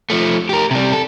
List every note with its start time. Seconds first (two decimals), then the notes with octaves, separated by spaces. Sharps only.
0.10 F3 A3
0.49 G4 A#4
0.71 C3 G3
0.92 A4